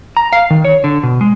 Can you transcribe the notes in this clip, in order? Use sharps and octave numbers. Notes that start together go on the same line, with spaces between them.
A#5
F5
D#3
C#5
D3
B2
G#3